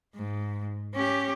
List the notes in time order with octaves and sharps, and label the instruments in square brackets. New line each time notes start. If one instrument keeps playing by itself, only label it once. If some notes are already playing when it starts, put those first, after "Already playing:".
[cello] G#2
C#4 G4